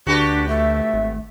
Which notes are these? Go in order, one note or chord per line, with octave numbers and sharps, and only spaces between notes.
D2 D4 F#4 G4 B4
A3 E5
G#1